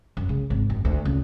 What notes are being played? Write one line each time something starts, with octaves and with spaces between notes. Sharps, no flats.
F#2
C#3
G#1
F#2
D2
C#2